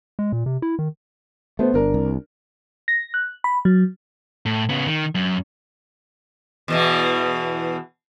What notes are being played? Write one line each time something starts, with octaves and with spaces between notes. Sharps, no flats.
G#3
A#2
C3
E4
D#3
A3 B3 C5
G1 D4 A#4
C2
A#6
F#6
B5
F#3
A2
C#3 B3
D#3
F#2
E2 B2 E3